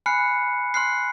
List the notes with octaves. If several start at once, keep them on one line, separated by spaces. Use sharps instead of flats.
G#5 B5 F6 F#6 C7 C#7
C6 F6 F#6 C7